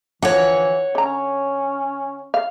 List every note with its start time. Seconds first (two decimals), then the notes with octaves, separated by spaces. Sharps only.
0.22 D3 E3 F3 C#5 F#5
0.95 D3 C#4 A#5
2.34 F5